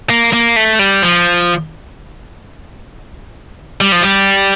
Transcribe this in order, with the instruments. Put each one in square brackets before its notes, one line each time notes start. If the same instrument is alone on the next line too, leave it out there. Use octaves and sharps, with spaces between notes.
[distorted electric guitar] A#3
A#3
A3
G3
F3
G3
F3
G3